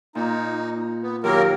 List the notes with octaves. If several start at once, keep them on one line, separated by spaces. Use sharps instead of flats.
A#2 D#4
B3
D#2 F#3 A#3 G4 A#4